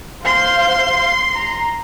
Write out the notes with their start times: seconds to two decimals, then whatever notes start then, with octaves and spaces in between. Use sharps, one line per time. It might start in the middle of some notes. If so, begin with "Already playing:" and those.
0.25 C5 F5 C6
1.33 A#5